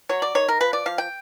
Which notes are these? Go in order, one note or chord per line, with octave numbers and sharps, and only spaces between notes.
F#3 C#5
D5
D#3 C#5
A#4
F3 B4
D5
F3 F5
G5